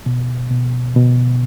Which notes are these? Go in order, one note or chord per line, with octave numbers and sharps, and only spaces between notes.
B2
B2
B2